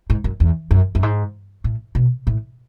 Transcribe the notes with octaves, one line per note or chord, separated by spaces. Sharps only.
G#2
F#2
E2
F#2
F#2
G#2
A2
B2
A2